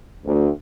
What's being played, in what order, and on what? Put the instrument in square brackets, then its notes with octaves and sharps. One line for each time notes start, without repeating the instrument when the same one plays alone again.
[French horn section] D2